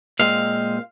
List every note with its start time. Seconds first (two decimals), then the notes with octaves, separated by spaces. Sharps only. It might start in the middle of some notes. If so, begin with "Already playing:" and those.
0.19 A#2 G#3 C4 F5